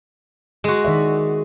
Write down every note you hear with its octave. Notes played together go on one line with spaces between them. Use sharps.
G#3 F#4
D#3 D5 E5